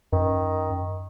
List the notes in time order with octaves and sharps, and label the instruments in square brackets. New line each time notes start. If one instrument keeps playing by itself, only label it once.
[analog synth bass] F#2 [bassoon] D#3